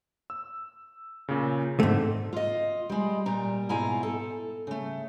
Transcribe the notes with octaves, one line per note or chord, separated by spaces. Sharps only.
E6
A#2 C#3
G#2 D3 A3 C4
F4 D#5
G3 G#3
A#2 G3 A#5
G#2 B2 E4 F4 G#5 A#5
A4
C#3 A3